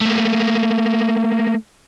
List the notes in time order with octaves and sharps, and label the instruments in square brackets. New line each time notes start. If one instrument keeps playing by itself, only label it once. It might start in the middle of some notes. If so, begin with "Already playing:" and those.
[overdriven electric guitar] A3 A#3